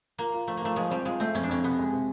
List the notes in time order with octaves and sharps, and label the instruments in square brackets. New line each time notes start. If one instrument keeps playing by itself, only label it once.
[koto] A#3 [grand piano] F4
[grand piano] F4
[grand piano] F3 [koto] A3
[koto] A#3
[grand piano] F3 [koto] A3
[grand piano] F3 [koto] G#3
[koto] G3 [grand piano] C4
[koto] G#3 [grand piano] F4
[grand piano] A3 [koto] C4
[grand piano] F2 [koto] C#4
[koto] D4
[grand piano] F2 [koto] C#4
[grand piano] C3 [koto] B3
[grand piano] G#3
C3